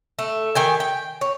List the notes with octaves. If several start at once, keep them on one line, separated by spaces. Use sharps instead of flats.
A3
D#3 G4 G#5
G5
C#5